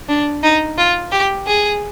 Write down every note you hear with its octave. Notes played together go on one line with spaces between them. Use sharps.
D4
D#4
F4
G4
G#4